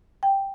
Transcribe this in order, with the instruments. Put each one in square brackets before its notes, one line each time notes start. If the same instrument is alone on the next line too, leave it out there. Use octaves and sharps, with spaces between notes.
[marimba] G5